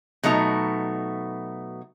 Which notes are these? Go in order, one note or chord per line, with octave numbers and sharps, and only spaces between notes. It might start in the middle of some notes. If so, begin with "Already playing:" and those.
B2 F#3 A3 D#4 A#5